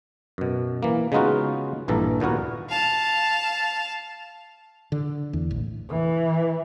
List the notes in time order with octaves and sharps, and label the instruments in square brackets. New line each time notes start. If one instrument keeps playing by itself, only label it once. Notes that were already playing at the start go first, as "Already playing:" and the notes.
[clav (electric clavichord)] F#2 B2
E3 A#3
C#3 G#3 B3 D#4 F4 F#4
A#1 G2 E3 A4 A#5
D#2 A#2 B3 F#4 A#4
[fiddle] F5 A5
[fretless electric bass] D3
E2
A1
[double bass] E3